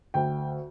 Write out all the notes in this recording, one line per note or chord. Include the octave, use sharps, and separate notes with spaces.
D2 G5